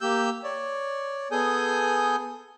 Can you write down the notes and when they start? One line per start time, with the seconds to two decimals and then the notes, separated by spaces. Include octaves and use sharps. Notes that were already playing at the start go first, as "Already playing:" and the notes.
0.01 A#3 G4 E6 G6
0.44 C#5 D5
1.31 B3 G#4 A4 G#5 D#6 G6